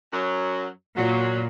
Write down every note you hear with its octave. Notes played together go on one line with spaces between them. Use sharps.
F#2 F#3
A#2 F#3